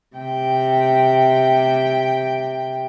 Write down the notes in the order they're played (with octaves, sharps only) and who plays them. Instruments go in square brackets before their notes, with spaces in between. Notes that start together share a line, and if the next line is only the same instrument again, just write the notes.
[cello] C3 G5